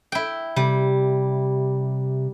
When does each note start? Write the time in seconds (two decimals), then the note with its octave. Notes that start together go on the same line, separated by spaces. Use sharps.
0.12 E4 G5
0.56 C3 G3